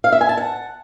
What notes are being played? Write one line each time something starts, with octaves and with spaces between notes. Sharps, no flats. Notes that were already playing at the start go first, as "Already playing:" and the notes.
F5
E5
G#5
A5
F#5